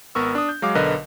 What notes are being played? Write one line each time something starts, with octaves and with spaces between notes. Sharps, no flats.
G#1 B3 A#4 C#6 E6
D4 D#6
G6
F#3 G#3 F5 D6
B1 D3 A#4 B4 D#5